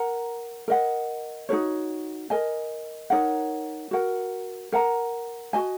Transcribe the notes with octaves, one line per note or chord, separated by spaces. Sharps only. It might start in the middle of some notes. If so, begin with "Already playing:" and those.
Already playing: A#4 F#5 A#5
A#4 D#5 F#5
D#4 F#4 A#4 C#5
A#4 D#5 G#5
D#4 A#4 C#5 F#5
F#4 A#4 F#5
A#4 F#5 A#5
F#4 D#5 G#5